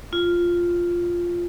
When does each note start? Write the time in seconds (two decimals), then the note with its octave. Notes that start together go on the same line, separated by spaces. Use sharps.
0.13 F4